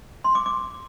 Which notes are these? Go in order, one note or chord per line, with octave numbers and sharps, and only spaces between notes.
C6
D6
D6